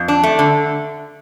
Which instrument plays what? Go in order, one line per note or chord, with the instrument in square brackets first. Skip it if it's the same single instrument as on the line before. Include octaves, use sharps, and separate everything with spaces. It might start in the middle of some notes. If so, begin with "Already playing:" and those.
Already playing: [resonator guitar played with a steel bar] F2
D4
A3
D3